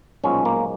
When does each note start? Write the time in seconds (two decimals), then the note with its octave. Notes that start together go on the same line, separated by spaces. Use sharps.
0.24 B1 A#2 F3 G#3 C#4
0.45 A#3